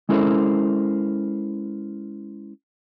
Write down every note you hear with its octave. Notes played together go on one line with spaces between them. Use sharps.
G#3 C#4 E4 A4 A#4 C5